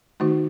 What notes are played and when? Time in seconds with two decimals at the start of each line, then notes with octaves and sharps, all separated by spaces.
0.20 D#3 A3 D#4 F#4